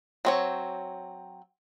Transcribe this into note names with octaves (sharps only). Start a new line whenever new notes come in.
F#3 C4 C#5